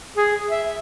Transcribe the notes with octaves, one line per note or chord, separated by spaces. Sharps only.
G#4
E5